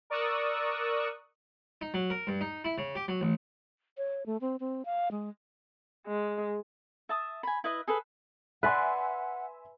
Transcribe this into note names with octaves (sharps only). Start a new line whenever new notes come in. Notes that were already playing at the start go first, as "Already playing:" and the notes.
A#4 D5 C#6 D#6 E6 F#6
D#4
F#3
A#4
G2
D#4
E4
C#3
G4
F#3
A1
C#5
A3
C4
C4
F5
G#3
G#3
E5 A5 D#6
G#5 B5
E4 B4 D#5 E5
G#4 A4 B4
B4 D5 E5 F#5 G#5 C6